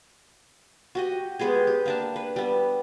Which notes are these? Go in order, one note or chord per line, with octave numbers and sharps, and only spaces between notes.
F#4 G4 D#5
G#3 B3 G4 G#4
G4
A#3 D4 A5
B4
G3 B3